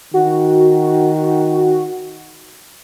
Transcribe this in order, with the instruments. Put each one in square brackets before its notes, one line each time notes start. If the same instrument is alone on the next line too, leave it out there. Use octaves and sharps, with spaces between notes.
[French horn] D#3 [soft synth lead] F#4